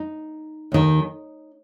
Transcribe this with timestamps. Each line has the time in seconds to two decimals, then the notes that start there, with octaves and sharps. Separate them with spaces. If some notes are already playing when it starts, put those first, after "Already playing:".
Already playing: D#4
0.72 D#2 D#3